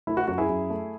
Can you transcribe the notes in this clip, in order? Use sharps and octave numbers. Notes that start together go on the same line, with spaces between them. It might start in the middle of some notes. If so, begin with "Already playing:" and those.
A3 E4
F#4
F#2 F#4
E4 G#4
F#2
A3